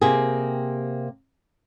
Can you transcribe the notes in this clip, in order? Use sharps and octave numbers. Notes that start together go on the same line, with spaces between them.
C3 A#3 C4 G4 G#4